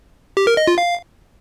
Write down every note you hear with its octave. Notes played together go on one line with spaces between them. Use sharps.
G4
A#4
D#5
F4
F5